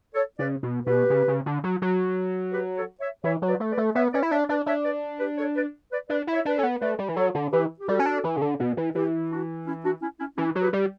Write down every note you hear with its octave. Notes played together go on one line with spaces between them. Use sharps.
A4 C#5
C#3 B4 D5
B2
B2 G4 B4
C#3
C#3
D3
F#3
F#3
G4 B4
A4 C#5
C#5 E5
E3 C#5 E5
F#3
B4 D5
A3
B4 D5
A3
B3 C#5 E5
C#4 B4 D5
E4
D4 C#5 E5
D4 B4 D5
D4 C#5 E5
B4 D5
G4 B4
A4 C#5
B4 D5
B4 D5
D4 B4 D5
E4
C#5 E5
D4 B4
C#4 A4 C#5
B3
A3 B4 D5
G3
E3
F#3 A4 C#5
D3
E3 G4 B4
G4
G3 F#4 A4
C#4
D4
E3
C#3
D3
B2
E3
E3 E4 G4
D4 F#4
C#4 E4
D4 F#4
C#4 E4
C#4 E4
E3 C#4 E4
F#3
G4 B4
G3